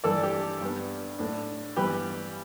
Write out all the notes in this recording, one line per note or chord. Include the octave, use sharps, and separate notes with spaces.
G2 E3 A3 D4 A4 D5
G4
G2 G3 B3 D4
A2 A3 D4
G2 E3 G3 B3 G4 B4